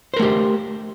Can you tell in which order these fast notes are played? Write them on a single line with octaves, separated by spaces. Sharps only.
C5 A#4 A3 G4